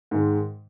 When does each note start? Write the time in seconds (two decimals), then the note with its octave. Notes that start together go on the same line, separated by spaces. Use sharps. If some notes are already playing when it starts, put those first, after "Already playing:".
0.11 G#2 D#3 G#3